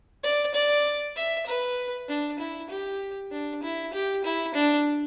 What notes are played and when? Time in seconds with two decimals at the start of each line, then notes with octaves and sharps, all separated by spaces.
0.23 D5
0.54 D5
1.16 E5
1.46 B4
2.09 D4
2.39 E4
2.70 G4
3.31 D4
3.63 E4
3.93 G4
4.24 E4
4.54 D4